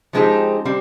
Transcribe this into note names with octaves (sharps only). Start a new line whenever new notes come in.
F3 G#3 C4 D#4 G4
G3 C4